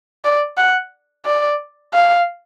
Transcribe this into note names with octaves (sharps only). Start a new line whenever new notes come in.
D5
F#5
D5
F5